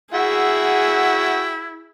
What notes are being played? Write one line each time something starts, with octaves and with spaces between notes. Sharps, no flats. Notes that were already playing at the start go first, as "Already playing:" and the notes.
E4 F#4 G#4 E5 F#5 G5